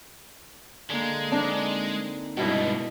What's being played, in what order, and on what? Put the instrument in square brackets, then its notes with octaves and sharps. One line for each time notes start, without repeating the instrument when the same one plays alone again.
[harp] D3 A#3 [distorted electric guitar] G#3
[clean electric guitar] C4 D#4 G#5 [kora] D4
[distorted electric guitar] C#2 G2 [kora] B2 E4 D#5